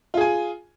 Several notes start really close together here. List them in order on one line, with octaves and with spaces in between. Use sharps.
F4 G#4 G#5